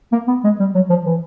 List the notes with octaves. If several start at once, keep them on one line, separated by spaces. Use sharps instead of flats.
A#3
B3
G#3
G3
F#3
F3
E3